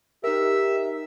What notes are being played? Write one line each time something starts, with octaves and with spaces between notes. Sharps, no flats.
D#4 G4 A#4 E5